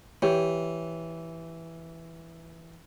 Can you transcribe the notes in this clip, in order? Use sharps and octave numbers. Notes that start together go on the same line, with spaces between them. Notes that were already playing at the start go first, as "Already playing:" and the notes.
E3 G4 C#5